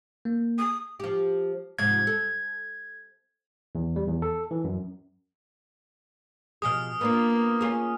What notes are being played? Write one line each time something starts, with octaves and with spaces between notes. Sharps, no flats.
A#3
D#6
F3 G4
G#2 C3 F3 G#6
A4
E2
G3
E2
A4
E3
F#2
B2 F3 G#4 D#6 F6
A#3 B3 D4 F4
C#4 F4 G#4